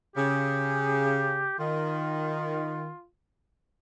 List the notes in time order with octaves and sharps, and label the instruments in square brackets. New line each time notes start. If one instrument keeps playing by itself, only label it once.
[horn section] C#3 [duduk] G4
[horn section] D#3 [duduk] F4